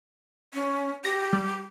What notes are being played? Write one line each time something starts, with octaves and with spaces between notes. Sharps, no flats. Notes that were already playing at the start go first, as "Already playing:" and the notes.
C#4
G4 A#6
G3